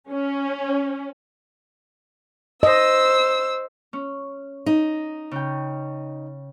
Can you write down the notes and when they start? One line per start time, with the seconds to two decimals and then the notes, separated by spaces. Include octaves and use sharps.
0.10 C#4
2.63 C5 D#5 E6
3.93 C#4
4.66 D#4
5.31 C#3 G5